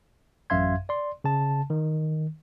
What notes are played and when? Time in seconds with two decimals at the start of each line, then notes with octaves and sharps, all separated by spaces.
0.50 A1 F#2 E5 F5 C6 G#6
0.89 D5 C6
1.24 C#3 A5
1.70 D#3